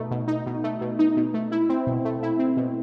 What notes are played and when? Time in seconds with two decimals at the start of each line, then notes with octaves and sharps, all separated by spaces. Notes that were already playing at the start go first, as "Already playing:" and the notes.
Already playing: B2 A3 D#4
0.11 B2
0.28 D#4
0.46 B2
0.64 A3
0.81 B2
0.99 D#4
1.17 B2
1.34 A3
1.52 E4
1.69 C4
1.87 B2
2.05 A3
2.23 E4
2.39 C4
2.57 B2